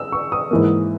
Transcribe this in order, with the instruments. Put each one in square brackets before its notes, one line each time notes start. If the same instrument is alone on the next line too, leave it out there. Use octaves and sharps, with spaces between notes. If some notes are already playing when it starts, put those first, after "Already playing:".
Already playing: [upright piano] E6
C#6
D#6
G#2 E3 A#3